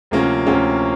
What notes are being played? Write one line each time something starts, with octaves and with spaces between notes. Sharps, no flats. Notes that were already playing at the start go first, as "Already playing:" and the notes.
D2 C3 F3 A#3 C#4
D2 C3 F3 A#3 C#4